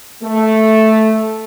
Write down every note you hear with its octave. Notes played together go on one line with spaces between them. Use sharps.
A3